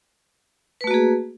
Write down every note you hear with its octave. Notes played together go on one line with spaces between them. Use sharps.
A3 A#3 F#4 G#4 B4